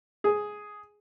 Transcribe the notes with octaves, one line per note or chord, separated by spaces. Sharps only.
G#4